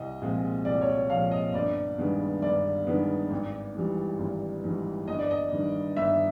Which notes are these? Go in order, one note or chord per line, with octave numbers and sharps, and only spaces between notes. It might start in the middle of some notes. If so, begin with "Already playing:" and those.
Already playing: C2 D#5
A#2 F3 G#3 C4
C2 D5
C#5
D5
A#2 F3 G#3 C4 F5
D#5
G1 D5
G2 D#3 G#3 B3
G1 D5
G2 D#3 G#3 B3
G#1
G#2 E3 G3
G#1
G#2 E3 G3
G1 D#5
D5
D#5
G2 D#3
G1 E5